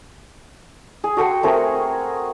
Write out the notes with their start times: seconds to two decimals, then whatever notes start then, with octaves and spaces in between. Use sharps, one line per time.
1.04 G#4
1.17 F#4 A4 G5 C6
1.43 A3 C4 G#4 A#4